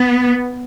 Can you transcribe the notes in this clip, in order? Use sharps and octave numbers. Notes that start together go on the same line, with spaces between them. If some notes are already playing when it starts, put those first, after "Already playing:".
Already playing: B3